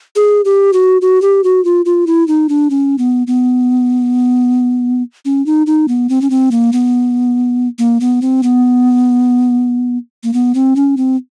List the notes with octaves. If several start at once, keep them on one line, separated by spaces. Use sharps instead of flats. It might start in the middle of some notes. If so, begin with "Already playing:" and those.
G#4
G4
F#4
F#4
G4
F#4
F4
F4
E4
D#4
D4
C#4
B3
B3
C#4
D#4
D#4
B3
C4
C#4
C4
A#3
B3
A#3
B3
C4
B3
A#3
B3
C4
C#4
C4